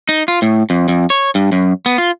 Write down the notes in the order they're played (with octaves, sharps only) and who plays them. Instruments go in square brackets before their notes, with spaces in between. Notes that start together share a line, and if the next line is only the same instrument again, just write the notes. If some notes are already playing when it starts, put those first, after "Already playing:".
[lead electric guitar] D#4
F4
A2
F2
F2
C#5
G2
F#2
B3
F4